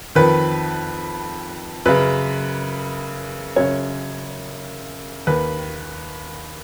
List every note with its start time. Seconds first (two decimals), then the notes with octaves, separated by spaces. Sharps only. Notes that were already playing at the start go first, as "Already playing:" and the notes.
0.15 F2 D#3 B4
1.85 F#2 C#3 B4
3.56 F#2 C#3 C#5
5.27 D#2 D#3 B4